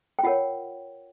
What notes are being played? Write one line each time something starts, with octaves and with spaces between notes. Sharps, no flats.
G5
F4 A#4 C#5 F#5